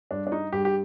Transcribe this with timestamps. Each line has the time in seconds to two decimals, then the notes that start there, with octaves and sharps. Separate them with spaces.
0.11 G2 D4
0.27 D4
0.32 D#4
0.52 G2 G4
0.65 G4